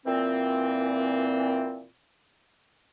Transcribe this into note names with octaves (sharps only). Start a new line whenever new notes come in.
A#2 E3 C4